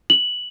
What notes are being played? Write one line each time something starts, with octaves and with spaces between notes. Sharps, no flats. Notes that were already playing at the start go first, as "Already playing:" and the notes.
F#7